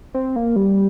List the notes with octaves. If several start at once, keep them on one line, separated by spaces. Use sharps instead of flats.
C4
A#3
G3